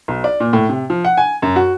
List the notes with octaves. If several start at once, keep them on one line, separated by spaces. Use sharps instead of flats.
B1
D5
A#2
A2
C3
F3
F#5
G#5
F#2
F#4